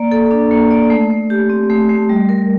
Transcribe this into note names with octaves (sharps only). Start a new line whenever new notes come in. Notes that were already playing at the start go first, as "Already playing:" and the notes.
Already playing: A#3 D5
A4
D4
A#3
D5
A3
A3
G4
C4
A3
A3
G3
A#4